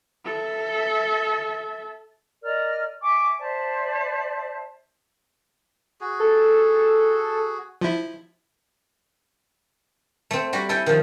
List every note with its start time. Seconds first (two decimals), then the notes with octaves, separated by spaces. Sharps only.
0.25 A4 E5
2.43 A#4 D5 D#5 F6
3.00 E5 G#5 C#6 D6
3.39 C5 D5 E5 A5
6.01 F#4 G#4
6.20 A4
7.81 F3 E4
10.31 A3 C4
10.53 G3 F#4
10.69 E4 A4 G5 G#5
10.86 D#3 F3